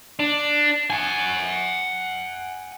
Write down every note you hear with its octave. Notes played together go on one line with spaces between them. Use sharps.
D4
F#5 G#5